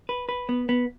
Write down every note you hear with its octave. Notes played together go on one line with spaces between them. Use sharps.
B4
B4
B3
B3